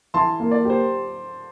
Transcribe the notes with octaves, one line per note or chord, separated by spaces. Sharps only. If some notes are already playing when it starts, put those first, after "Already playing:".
E3 A5 C6
A#3
D5
G4
C5